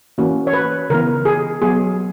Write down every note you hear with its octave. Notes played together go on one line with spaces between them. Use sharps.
E3 A#3 C#4 F#4
C#5
B4
C#3 E3 B3 A#4
G#4
F#3 B3 G#4